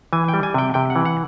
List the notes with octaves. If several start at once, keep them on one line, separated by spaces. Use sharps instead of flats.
E3 G#5
G5
G3
G#5
C3 G5
C3 G5
F#5
E3
F#5